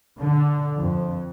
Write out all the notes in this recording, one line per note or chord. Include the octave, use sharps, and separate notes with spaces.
D3
F2